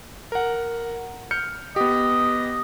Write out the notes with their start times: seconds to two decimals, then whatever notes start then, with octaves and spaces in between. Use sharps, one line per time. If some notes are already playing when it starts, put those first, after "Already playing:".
0.32 A#4 F#5
1.31 F6 G6 C#7
1.76 B3 G4 D#5